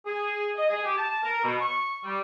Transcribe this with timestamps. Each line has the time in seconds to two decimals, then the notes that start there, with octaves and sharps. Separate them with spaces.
0.06 G#4
0.57 D#5
0.70 G#4
0.84 G4
0.97 A5
1.23 A#4
1.43 B2
1.61 C#6
2.04 G3